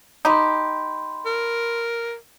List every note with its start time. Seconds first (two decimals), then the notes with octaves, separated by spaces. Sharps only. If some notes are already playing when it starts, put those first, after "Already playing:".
0.25 D#4 G4 B5 C6
1.26 A#4